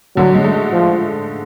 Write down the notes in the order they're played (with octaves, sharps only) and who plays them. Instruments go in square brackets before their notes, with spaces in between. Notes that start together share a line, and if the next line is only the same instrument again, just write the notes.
[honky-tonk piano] D3 [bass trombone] F#3
[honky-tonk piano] G#3
A3
[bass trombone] F3